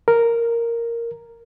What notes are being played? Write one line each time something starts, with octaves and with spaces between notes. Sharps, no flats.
A#4